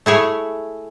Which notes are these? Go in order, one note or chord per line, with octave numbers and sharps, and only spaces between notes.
A3 E4 G#4 C#5